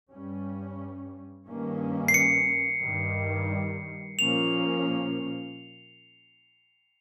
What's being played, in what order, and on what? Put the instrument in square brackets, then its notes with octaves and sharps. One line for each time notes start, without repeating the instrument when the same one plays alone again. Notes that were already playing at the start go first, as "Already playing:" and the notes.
[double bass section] G2 G3 C#4
G2 D#3 A#3 C#4
[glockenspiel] C7
C#7
[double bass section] G2 D#3 G3
[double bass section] A#2 F3 A#3 C#4 [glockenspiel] F7